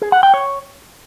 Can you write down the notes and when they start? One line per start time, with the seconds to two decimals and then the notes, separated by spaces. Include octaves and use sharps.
0.02 G#4
0.12 F#5
0.23 G5
0.34 C#5